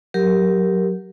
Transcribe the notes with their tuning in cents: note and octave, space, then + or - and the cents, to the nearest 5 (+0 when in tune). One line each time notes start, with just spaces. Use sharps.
F#3 -5 G4 -5 A#4 +0